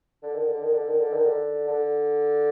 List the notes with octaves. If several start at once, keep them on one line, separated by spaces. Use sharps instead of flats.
D3
D#3
D3
D#3
D3
D#3
D3
D#3
D3
D3